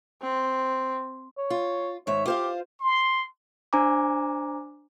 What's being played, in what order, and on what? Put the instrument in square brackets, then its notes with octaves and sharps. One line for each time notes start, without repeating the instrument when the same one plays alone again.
[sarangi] C4
[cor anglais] C#5
[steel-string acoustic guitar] F4
[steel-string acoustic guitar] G#2 D#3 E5 [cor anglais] C#5
[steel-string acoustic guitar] F4 C5 F5 [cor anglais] G4
[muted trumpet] C6
[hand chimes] D4 C5 G#5 A#5 D6